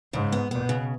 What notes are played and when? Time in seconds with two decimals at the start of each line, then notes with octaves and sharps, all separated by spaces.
0.13 G#2 C#3
0.32 B3
0.51 B2 B3
0.69 C#3